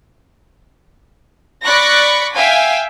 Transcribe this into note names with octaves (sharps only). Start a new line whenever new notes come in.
D5 B5 C#6 F#6 A#6
E5 F5 G5 G#5